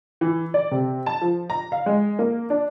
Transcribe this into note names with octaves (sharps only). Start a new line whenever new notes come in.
E3
D5
C3
A5
F3
A#5
F5
G#3
A#3
D4